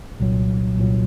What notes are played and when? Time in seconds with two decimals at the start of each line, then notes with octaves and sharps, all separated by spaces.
0.20 C2 A#2 F#3
0.76 C2 A#2 F#3